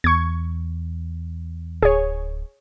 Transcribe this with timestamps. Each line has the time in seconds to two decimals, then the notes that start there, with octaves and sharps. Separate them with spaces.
0.04 E2 C#6 G#6
1.83 D1 G#4 C#5